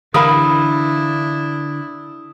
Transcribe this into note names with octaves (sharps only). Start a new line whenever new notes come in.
D3 E3 D4 E4 A#4 F5 B5 D#6